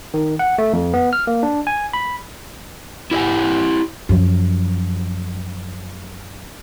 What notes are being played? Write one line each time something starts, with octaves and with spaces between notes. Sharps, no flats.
D#3
F#5
A3
F2
B3
F6
A#3
D4
G#5
B5
E4 G4 A4 D#5 F#5 G#5
F#2 F3